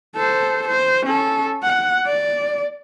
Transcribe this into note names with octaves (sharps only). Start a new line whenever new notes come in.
A4 C5
C5
C#4 A4
F#5
D5